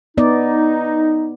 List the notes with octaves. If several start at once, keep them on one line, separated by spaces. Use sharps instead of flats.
B3 D#4 D5